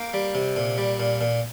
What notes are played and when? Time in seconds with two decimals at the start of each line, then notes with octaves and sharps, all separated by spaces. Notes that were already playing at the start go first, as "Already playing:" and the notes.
Already playing: A#3 G5
0.14 G3
0.35 C3
0.56 A#2
0.78 G3
0.99 A#2
1.21 A#2